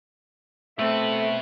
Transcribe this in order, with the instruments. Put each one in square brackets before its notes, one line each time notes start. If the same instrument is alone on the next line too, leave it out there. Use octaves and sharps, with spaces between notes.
[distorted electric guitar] B2 B4 [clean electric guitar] A3 C4 [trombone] A4 [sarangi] E5